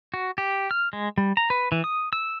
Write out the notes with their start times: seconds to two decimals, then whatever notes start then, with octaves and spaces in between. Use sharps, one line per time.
0.14 F#4
0.38 G4
0.71 F6
0.93 G#3
1.18 G3
1.37 A#5
1.50 B4
1.72 E3
1.84 D#6
2.13 E6